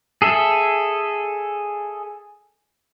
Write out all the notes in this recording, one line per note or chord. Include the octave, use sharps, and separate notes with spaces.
G#4 A4 E5